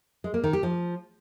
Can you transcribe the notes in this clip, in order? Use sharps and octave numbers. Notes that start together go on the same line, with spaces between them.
G#3
A#3
D#3
G4
F3